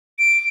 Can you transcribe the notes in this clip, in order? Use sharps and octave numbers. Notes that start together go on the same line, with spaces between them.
D7